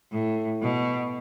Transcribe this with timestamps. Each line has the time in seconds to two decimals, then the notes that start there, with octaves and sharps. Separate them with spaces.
0.10 A2
0.61 B2